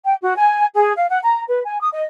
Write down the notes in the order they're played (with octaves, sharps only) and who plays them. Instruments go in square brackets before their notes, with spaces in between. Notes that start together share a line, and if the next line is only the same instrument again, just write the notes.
[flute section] G5
F#4
G#5
G#4
F5
F#5
A#5
B4
G#5
D#6
D#5